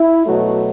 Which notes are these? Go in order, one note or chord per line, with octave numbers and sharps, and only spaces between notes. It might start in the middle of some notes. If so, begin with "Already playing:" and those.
Already playing: E4
B2 F#3 A3 F#4